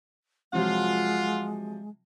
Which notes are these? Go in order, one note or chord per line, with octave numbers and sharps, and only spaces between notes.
C3 F3 F#3 G#3 F4 F#5